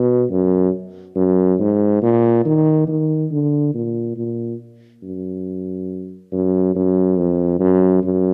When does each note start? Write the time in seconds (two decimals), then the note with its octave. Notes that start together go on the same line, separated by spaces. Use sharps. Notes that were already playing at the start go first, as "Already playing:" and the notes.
Already playing: B2
0.30 F#2
1.16 F#2
1.59 G#2
2.02 A#2
2.45 D#3
2.88 D#3
3.31 D3
3.74 A#2
4.17 A#2
5.03 F#2
6.32 F#2
6.75 F#2
7.17 F2
7.60 F#2
8.03 F#2